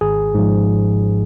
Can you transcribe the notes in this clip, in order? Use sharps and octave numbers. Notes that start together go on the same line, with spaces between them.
G#1 G#4
G#2 F3